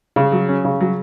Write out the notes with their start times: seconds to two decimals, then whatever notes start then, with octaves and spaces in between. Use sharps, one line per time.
0.16 C#3
0.32 F#3
0.49 C#4
0.65 C#3
0.81 F#3